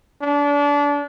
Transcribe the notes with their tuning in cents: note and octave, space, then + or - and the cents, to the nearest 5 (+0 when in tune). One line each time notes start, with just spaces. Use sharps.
D4 -30